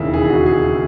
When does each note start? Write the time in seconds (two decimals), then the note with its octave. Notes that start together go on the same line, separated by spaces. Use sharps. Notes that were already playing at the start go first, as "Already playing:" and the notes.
Already playing: E1 D#2 C#3 D#4 E4 E5
0.14 G#4
0.30 F#4
0.46 G#4